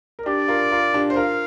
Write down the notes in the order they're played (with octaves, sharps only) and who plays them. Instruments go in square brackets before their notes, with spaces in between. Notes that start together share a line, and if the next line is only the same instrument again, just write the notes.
[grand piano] A#4
[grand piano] D4 G4 [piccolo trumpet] D5
[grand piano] F4 A#4
F4 A#4
D4 G4
C5
[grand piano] F4 A#4 [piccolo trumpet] F5